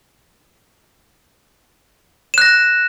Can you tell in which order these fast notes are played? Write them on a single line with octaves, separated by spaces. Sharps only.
E7 F#6 A#6